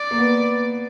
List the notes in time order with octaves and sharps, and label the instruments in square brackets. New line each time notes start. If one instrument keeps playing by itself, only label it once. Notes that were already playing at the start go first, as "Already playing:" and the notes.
Already playing: [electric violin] D5
[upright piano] A#3
B3